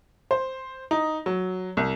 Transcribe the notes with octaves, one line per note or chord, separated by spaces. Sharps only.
C5
D#4
F#3
C2